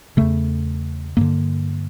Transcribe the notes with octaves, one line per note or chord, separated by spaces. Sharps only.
E2 C#3 A3
G2 D3 A#3